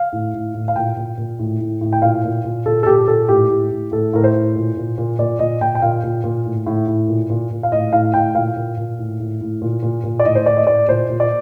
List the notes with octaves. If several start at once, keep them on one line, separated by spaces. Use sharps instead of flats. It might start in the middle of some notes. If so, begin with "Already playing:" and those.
Already playing: F5
A2
A2
A2
F5
A#2 G5
A#2
A#2
A2
A2
A2
G5
A#2 F5
A#2
A#2
A#2 A4
A4
A#2 G4
A#2 A4
A2 G4
A2
A2
A2 A4
A2 A#4
C5
A2
A#2
A#2
A#2
A#2 D5
A#2 D#5
A#2 G5
G5
A#2 F5
A#2
A#2
A2
A2
A2
A#2
A#2
A#2
F5
A2 D#5
A2 F5
A2 G5
A#2 F5
A#2
A#2
A2
A2
A2
A#2
A#2
A#2
D5
A2 D#5
C5
A2 D5
D#5
A2 D5
A#2 C5
A#2
D5